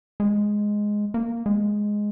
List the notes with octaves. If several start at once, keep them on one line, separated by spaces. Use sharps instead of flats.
G#3
A#3
G#3